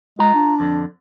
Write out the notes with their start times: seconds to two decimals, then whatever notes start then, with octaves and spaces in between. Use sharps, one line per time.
0.19 G#3 F4 A#5
0.34 D4
0.60 F2 D3